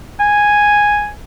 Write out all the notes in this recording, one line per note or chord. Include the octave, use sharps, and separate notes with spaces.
G#5